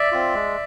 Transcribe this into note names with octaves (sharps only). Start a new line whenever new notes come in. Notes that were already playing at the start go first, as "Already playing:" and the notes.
Already playing: D5 E5
C4 F4
G#3